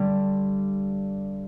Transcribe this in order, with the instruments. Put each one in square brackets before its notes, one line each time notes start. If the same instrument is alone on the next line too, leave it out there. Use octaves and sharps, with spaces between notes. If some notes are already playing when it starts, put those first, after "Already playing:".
Already playing: [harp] G2 D3 G3